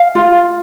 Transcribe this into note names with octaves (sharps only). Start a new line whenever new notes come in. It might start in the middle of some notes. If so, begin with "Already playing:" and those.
Already playing: F5
F4